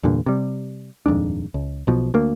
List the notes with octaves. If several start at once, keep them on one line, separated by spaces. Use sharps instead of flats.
E2 G2 A#2 D3
C3 G3
D#1 F2 G#2 D4
C#2
B1 B2 F3
D2 A#3